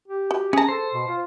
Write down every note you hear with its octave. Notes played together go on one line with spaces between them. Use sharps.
G4
F#4
C#4 G#4 A5 A#5
A4 C5
B2
F4